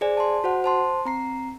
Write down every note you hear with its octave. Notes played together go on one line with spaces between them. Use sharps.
G#4 C5 D5 G#5
A5 C6
F#4 C5 F#5
C5 A5 C6
C4 A#5 C7